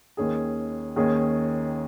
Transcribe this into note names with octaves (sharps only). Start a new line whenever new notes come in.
D#2 D#3 C#4 G#4
D#2 D#3 C#4 G#4